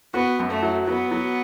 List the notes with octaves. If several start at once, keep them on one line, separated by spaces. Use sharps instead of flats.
B3 F#4
F#2
A3
F#3
F#3 B3
F#3